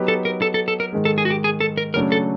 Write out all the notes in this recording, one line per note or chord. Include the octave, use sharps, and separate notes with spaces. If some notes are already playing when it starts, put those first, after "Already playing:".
Already playing: F#3 B3 D#4 G4 B4
A4
A#4
A4
A4
A4
A#4
G#2 D#3 G#3
A4
G#4
F#4
G4
G#4
A4
A#4
C#3 F#3 A3 D4 A#4
A4